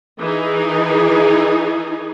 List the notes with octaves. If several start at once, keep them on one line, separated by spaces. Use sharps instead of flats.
E3 D#4 G#4